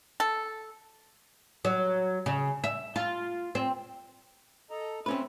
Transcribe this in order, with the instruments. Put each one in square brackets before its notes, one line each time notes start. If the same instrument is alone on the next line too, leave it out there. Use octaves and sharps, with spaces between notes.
[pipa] A4
[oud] F#3
C#3
E5
F4
C4
[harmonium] A4 D#5 A#5
[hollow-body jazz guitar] C4 C#4 B4 [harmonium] E5